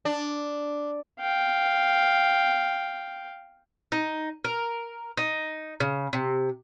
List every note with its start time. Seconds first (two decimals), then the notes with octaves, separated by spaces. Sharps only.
0.05 D4
1.20 F5 G5
3.92 D#4
4.44 A#4
5.17 D#4
5.80 C#3
6.13 C3